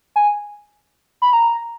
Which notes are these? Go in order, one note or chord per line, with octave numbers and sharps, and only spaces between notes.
G#5
B5
A#5